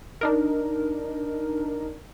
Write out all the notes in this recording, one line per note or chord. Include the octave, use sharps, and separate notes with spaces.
D4 D#4 A#4